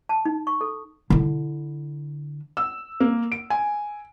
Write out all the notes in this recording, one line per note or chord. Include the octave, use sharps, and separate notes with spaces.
A5
D#4
C#6
A4
D3 E4
E6
A#3
D7
G#5